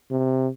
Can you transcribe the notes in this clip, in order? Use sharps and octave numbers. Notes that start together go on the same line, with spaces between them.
C3